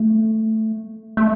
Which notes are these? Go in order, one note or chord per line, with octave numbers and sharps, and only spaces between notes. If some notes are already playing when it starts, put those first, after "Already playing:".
Already playing: A3
A3